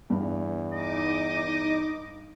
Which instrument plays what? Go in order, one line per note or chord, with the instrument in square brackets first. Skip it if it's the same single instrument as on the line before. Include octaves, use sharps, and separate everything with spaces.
[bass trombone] E2 [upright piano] G2
[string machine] D#4 D6 [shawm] D#5